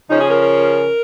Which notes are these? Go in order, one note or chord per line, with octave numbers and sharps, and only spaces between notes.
C#3 F3 C#4 D#4
G#4
A#4
A#4